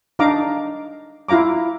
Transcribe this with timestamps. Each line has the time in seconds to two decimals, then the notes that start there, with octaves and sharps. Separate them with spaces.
0.19 D4 D#4 F5 A#5 D6
1.28 E4 F4 F5 A#5 D6